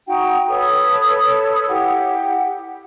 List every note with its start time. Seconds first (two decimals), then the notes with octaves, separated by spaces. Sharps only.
0.08 D#4 F#4 F#5 G5
0.49 A4 B4 C#5 D#6
1.68 E4 G4 F#5